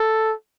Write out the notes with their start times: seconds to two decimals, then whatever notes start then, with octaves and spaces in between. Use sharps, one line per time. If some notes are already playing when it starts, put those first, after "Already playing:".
Already playing: A4